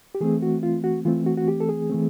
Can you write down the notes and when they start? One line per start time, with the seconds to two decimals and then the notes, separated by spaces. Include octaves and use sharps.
0.15 G4
0.21 E3 A3 C4 G#4
0.42 F#4
0.63 F4
0.84 F#4
1.05 E3 A3 C4 F4
1.26 F#4
1.37 F#4
1.48 G4
1.60 A4
1.69 G#4
1.90 E3 A3 C4